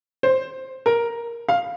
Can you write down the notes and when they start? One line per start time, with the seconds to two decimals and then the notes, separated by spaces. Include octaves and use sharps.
0.23 C5
0.86 A#4
1.49 F5